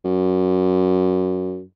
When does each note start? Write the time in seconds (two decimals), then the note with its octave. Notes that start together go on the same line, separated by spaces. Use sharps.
0.05 F#2